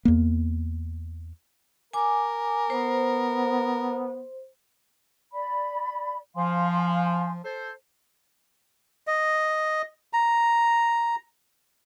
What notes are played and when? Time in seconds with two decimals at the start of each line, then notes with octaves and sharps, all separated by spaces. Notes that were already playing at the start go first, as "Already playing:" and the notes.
0.05 E2 A#3
1.93 A#4 G#5 D6
2.70 B3 C5
5.32 D5 B5
6.36 F3 F5 G#5 C6
7.45 A4 C5
9.07 D#5
10.13 A#5